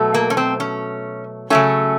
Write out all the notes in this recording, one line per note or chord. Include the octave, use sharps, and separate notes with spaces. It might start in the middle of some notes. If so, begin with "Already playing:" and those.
Already playing: B2 F#3 A3
A#3
C#4
C4
C#4
C#3 F#3 A3 C#4